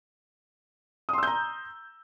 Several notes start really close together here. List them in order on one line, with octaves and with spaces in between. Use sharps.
D#6 C6 E6 G6 A#5